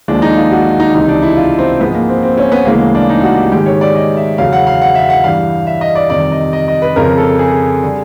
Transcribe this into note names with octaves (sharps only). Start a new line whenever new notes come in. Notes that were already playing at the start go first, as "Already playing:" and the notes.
D#2 D3 F3 G#3 D4
D#4
F4
F#4
D#4
C#2 C3 E3 D#4
D4
E4
F4
C4
G#2 F3 G#3 B3
A#3
C4
C4
C#4
B3
D2 C#3 E3 G#3 A#3
D4
D#4
F#4
G4
G#2 D#3 G#3 G4
C#5
D5
D#5
E5
E2 C#3 F#3 F5
F#5
F5
F#5
E5
F#5
G2 E3 G3 F5
E5
D#5
D5
F2 C3 D#3 G3 D5
D#5
D#5
D#5
B4
F2 C#3 F3 A#4
A4
G#4
D3 G3